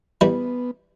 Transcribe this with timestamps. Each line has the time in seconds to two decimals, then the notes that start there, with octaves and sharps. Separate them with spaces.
0.21 E3 G3 B3